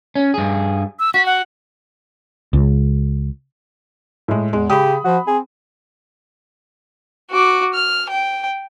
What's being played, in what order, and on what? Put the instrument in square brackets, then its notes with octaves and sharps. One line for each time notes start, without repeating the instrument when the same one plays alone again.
[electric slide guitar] C#4
G2 G#4
[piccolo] E6
[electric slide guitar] F#4 [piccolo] B6
[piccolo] F#5
[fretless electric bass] C#2
[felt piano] A2 G#3
[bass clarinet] E2 [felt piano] G#3
[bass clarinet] C#3 [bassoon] G4 [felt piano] B5 D#6
[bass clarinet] F3 [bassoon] F#4
[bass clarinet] C4 [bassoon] G#4
[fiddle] F#4 D6
F6
G5